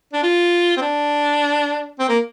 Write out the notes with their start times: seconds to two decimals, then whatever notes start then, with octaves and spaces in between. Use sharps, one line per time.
0.13 D4
0.23 F4
0.77 C4
0.82 D4
1.99 C4
2.09 A#3